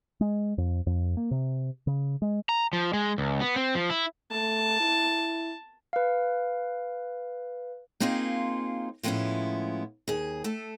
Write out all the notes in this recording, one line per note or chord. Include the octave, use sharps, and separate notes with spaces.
G#3
F2
F2
A#3
C3
C#3
G#3
A#5
F3
G#3
C#2
B3
C4
F3
E4
A3 A5
E4
B4 F5
A#3 C4 D#4 F4 G#4 C5
A2 F3 G#3 B3 C#4 E4
D#2 G#4
A3 A4